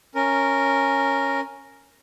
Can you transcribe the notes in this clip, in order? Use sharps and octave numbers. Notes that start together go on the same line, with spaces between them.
C#4 A#4